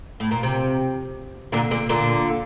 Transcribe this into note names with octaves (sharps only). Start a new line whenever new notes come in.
A2
A#2
C3
A#2 D3
A#2 D3
A#2 D3